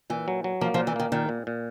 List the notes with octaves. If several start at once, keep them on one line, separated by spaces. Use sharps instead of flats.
A#2 E3
F#3
F#3
F3 A#3
F3
A#2
E3
D#3 A#3
A#2 D#3
A#2
A#2